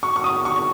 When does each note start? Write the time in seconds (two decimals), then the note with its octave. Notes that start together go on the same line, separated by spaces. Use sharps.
0.03 C#6
0.16 C#6
0.24 D#6
0.45 C#6